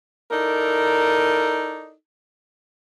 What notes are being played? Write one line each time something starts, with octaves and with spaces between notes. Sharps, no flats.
D#4 E4 A4 A#4 D5